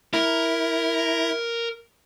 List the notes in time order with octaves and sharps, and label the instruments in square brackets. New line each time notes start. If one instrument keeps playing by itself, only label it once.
[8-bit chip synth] E4 [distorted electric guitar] A#4